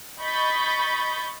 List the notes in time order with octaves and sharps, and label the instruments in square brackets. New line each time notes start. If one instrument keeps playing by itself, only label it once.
[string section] D#5 B5 C#6 G6 A6 B6